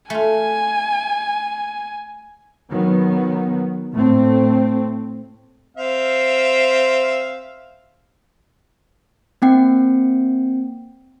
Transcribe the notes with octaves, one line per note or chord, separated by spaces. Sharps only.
A3 F4 G#5
D#3 F#3 B3
A2 A3 C4
C4 E5 F5
A#3 C4 G5 C7